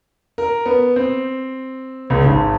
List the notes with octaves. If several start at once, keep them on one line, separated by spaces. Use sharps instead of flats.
A#4
B3
C4
C#2
G#1